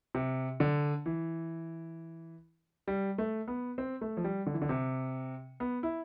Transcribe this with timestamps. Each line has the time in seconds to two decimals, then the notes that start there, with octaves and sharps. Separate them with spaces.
0.15 C3
0.60 D3
1.06 E3
2.88 G3
3.18 A3
3.48 B3
3.78 C4
4.01 A3
4.17 F3
4.24 G3
4.47 D3
4.54 E3
4.62 D3
4.69 C3
5.60 B3
5.83 E4